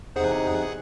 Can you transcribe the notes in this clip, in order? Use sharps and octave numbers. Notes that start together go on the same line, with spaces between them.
E2 C3 D#4 G#4 C5 F#5